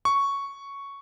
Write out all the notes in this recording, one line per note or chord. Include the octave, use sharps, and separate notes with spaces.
C#6